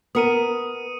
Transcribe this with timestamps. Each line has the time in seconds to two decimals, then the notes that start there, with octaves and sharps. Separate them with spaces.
0.15 B3 A#4 D#6 C#7 D#7